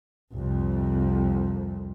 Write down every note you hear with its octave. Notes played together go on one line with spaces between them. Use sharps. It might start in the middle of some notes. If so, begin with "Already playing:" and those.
C2 F2